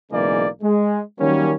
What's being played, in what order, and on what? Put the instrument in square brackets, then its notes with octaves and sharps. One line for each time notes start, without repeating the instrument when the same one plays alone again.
[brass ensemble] B1 C#3 E3 G#3 A#3 D5
G#3
D#3 F#3 G3 A#3 C#4